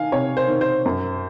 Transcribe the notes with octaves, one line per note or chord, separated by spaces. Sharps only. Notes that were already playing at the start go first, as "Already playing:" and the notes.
Already playing: D#3 F5 G#5
C3 C#5
C5
D#3
C5
F#2